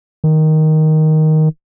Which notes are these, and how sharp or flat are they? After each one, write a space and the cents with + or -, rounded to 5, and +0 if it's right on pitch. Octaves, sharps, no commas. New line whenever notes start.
D#3 +5